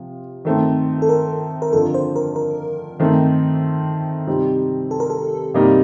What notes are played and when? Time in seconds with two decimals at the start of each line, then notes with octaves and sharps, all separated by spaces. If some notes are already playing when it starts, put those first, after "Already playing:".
Already playing: C3 F3
0.45 D#3 A3 C4
1.02 A4
1.09 A#4
1.62 A#4
1.72 F2 D3 F3 A4
1.94 C5
2.16 A#4
2.36 A#4
3.00 D#3 A3 C4 D#4
4.27 C3 G3 C4 D#4 G4
4.91 A4
5.00 A#4
5.10 A4
5.54 C3 G3 A#3 D#4